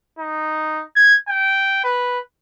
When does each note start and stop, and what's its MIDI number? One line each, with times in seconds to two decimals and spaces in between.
0.19 0.84 63
0.96 1.16 92
1.28 1.80 79
1.84 2.19 71